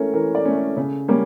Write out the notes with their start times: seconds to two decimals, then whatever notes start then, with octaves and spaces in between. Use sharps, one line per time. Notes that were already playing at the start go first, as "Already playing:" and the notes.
Already playing: E3 A3 C#4 A#4 C#5
0.14 E3 A#4
0.35 D5
0.45 A3 C#4
0.56 A4
0.77 C#3
1.08 G3 A#3 C#4